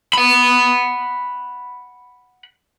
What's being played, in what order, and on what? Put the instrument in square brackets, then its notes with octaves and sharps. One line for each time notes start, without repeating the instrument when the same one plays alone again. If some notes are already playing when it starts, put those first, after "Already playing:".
[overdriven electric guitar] F#5 B5